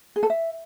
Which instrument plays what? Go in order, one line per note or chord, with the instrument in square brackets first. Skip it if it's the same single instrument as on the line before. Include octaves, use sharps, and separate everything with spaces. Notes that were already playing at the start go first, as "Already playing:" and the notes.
[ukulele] G#4
A4
E5